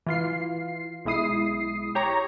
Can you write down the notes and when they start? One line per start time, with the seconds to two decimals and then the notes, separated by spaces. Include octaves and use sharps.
0.06 E3 F4 C7
1.05 B1 G#3 E4 D#6 C7
1.95 G4 C#5 A#5